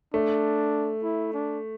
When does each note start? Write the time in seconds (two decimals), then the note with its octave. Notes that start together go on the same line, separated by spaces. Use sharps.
0.14 A3 D4
1.03 E4
1.33 D4